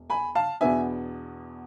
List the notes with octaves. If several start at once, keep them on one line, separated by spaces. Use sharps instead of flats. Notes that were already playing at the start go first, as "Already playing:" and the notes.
Already playing: E1
G#5 B5
F5 A5
E2 B2 B3 D4 E5 G#5